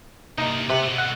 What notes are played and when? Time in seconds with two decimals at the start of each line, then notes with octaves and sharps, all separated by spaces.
0.38 C3 A#3 D#4
0.70 C3 B4 F#5
0.83 B2 A3
0.98 F#5